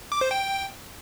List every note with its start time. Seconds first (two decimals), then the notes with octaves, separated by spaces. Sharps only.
0.12 D6
0.21 C5
0.31 G5